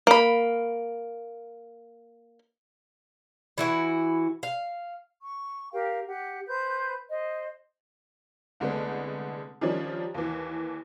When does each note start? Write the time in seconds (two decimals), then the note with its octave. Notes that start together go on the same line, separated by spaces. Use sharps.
0.07 A#3 B5
3.58 E3 E4 F#4
4.43 F5
5.22 C#6
5.73 G4 A#4 F5 G5
6.08 G4 F#5
6.48 B4 C5 G6
7.10 C5 D#5
8.60 C2 D3 G#3 A3 B3
9.61 D#3 F3 G3 C#4 D4
10.14 D#2 E3